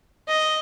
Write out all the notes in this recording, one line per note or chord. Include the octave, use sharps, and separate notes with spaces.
D#5